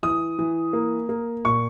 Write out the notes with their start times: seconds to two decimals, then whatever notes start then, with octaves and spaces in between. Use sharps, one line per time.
0.03 E3 D#6
0.39 E3
0.73 A#3
1.09 A#3
1.45 A#2 C#6